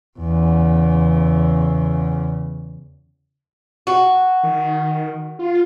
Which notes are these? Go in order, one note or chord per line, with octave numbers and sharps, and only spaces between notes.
E2 C#3
F#4
D#3
F4